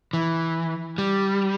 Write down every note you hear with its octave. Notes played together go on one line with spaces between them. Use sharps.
E3
G3